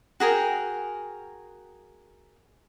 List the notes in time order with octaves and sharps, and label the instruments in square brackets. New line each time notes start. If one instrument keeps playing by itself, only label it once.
[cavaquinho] F#4 G#4 A#4 G5